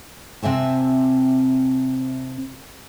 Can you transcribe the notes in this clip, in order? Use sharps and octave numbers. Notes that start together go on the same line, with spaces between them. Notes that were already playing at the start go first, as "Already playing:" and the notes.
C3 C4 E5 G#5 A5